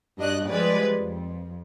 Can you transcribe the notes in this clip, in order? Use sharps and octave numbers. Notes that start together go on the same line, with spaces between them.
G2 D4 F#4 D#5 F#6
F3 G3 G#3 B4 D5
F2